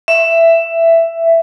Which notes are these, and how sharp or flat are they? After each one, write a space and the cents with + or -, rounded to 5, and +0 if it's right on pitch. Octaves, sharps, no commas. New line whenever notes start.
E5 +10